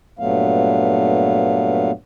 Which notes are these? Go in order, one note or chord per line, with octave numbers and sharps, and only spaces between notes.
G2 A#2 F#3 A3 B3 F5